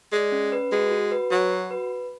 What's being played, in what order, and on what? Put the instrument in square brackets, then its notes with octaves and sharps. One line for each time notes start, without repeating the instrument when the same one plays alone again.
[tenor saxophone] G#3 [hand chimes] D5
[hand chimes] C#4
B4
[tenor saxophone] G#3 [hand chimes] F#4
[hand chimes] F#4
B4
[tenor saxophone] F#3 [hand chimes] F#4
[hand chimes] F#4
B4